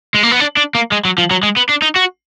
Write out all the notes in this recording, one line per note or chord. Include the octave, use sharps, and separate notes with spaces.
G#3
A#3
B3
D4
D4
A#3
G#3
F#3
F3
F#3
G#3
B3
D4
D#4
F#4